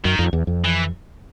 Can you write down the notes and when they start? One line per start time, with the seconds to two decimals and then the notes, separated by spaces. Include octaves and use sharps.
0.05 F#2 D#3
0.19 F2
0.33 E2
0.47 F2
0.65 E3